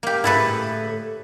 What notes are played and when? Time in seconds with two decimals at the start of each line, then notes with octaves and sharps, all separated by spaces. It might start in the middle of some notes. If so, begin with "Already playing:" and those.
0.03 A#3 G4
0.24 A2 D3 E4 G#4 A4 B4